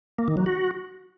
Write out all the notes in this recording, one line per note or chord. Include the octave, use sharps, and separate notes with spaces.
A#3
D#3
F#3
F#4